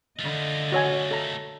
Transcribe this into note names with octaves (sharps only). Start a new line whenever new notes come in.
D3 A3 F4 D#5
F#4 C#5 G#5
A4 A#5